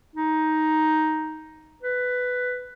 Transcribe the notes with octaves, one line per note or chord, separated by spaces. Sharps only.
D#4
B4